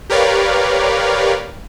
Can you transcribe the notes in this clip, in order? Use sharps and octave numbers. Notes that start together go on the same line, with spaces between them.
G4 A#4 B4 C#5 D5 F5